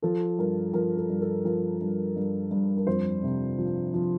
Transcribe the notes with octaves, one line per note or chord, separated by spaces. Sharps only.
F3 A4
G2 A#4
F3 A#4
A4
G2
A4
F3 A#4
G2
G2
G2
A#4
F2 C5
C3
F3
F3